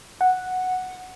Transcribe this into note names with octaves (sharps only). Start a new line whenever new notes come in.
F#5